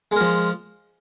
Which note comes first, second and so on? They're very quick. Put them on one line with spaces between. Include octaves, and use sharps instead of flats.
G#3 A#4 F3